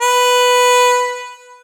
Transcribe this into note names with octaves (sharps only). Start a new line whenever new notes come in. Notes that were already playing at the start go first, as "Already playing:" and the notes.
B4